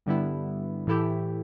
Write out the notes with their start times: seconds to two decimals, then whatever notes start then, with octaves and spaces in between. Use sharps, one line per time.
0.06 G2 D3 G3 B3 E4
0.87 A2 E3 A3 E4 G4